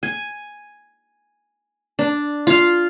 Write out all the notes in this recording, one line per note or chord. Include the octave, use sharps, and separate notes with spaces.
G#5
D4
F4 F5